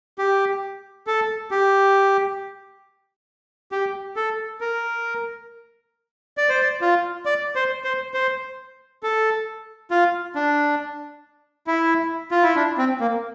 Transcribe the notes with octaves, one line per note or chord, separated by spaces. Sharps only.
G4
A4
G4
G4
A4
A#4
D5
C5
D5
F4
D5
C5
C5
C5
A4
F4
D4
E4
F4
E4
D4
C4
A#3